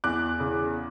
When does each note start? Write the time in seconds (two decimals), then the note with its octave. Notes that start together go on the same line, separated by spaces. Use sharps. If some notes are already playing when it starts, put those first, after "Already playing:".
0.04 E2 D6 F#6
0.40 C#3